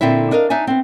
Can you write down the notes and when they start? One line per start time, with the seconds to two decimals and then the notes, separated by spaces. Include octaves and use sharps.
0.01 A#2 D3 C4 E4 E5
0.31 D4 A#4 D#5 F5
0.50 D4 D#4 E5 G#5
0.67 B3 C4